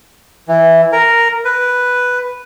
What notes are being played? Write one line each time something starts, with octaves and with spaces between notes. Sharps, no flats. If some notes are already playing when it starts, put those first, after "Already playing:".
E3
A#4
B4